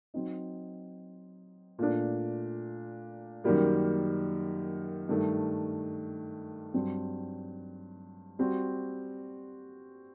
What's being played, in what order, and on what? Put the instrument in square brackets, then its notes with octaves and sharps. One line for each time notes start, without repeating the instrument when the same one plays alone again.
[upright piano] F#3 C4 D#4
A#2 A3 D4
F#2 D#3 G3 A#3
G2 D#3 A3
G2 F#3 C4
G3 C4 F#4